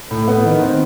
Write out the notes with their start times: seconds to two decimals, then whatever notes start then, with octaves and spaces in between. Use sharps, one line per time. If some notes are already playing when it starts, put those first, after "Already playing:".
0.11 A2
0.28 B3
0.45 D#3
0.62 C4